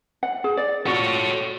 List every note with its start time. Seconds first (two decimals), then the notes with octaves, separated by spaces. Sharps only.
0.23 F#5
0.44 G#4
0.57 D5
0.86 F4 F#4 A4 C#5 F#5